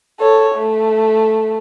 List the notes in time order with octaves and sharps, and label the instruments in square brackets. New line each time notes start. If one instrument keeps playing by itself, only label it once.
[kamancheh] A4 C#5
A3